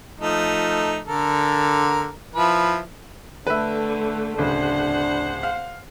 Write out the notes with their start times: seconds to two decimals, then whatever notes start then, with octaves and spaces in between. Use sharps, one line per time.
0.20 F3 A3 D#4
1.07 D3 A4 A#4
2.35 F3 E4 B4
3.47 D3 A3 B4 E5
4.38 D1 C#3 D4 C5 F#5
5.43 F5